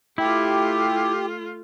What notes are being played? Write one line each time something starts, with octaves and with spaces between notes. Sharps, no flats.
A3 E4 F4 G4